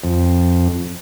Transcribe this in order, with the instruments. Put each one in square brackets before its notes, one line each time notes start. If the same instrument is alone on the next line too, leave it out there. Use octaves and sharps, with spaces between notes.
[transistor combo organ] F2